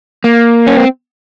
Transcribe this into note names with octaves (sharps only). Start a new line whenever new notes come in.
A#3
C#4
C4